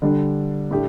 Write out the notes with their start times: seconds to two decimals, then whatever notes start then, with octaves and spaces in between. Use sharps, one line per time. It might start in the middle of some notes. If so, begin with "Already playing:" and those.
0.02 D3 G3 D4
0.71 A2 A3 D4 G4